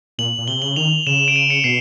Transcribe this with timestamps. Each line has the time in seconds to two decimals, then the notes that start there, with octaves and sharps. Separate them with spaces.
0.18 A#2 F#7
0.38 A#2
0.48 C3 G7
0.62 C#3 F#7
0.76 D#3 F7
1.07 C#3 E7
1.28 D7
1.36 D#7
1.50 C#7
1.64 B2 C7